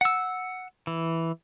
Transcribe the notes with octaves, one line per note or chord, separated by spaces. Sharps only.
F#5 E6
E3